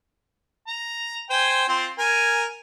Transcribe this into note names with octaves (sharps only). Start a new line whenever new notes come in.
A#5
C5 G5 G#5
C4 F4
A#4 G#5